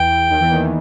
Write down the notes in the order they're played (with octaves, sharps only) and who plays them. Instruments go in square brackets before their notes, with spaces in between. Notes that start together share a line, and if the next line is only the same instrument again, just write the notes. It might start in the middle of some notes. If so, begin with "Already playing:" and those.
Already playing: [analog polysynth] E2 E3 [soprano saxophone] G5
[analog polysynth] D#2 D#3
E2 E3
D#2 D#3
E3